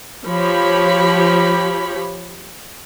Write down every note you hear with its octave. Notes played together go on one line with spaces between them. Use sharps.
F3 G4 C#5 B5